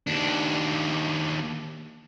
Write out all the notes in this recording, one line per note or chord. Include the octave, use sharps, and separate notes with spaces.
D#2 D4